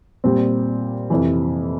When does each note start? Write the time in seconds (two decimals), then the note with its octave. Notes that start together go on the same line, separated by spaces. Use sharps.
0.24 A#2 G3 C4
1.10 F2 C3 E3